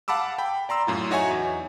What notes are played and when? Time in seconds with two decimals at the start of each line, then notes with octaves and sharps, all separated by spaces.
0.08 F5 F#5 A5 B5 D6 E6
0.38 G5 B5
0.69 D5 A#5 C6 E6
0.87 F#2 A2 F4
1.11 D#4 F#4 C#5 E5 G#5 C#6
1.31 E2